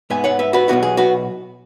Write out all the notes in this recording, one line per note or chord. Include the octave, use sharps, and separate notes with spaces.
G#2 G#3 B3 E5 G#5
C#5 F#5
B4 E5
F#4 B4
B1 B2 F#3 B3 E4 F#4
G#4
F#4 B4